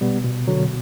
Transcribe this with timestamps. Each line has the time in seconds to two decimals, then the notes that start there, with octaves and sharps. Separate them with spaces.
0.01 B2 G3 B3
0.25 B2
0.47 B2 D3 F#3